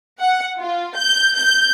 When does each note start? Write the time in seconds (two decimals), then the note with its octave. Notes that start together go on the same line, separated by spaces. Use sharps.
0.22 F#5
0.60 F4
0.97 G6
1.36 G6